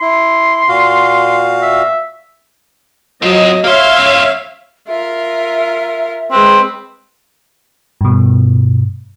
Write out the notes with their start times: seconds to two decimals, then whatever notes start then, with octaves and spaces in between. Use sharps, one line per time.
0.01 E4 C6
0.68 A#2 F#4 F5
1.62 E5
3.22 F#3 C4 F4 D#5
3.64 A#3 C5 C#5 E5 F5
3.96 F3 C#4
4.88 F4 A#4 E5
6.31 G#3 C4 B4
8.01 G2 B2